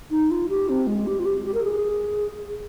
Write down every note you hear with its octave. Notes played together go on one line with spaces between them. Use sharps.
D#4
F4
G4
C4
G#3
G4
F4
G4
G4
A#4
G#4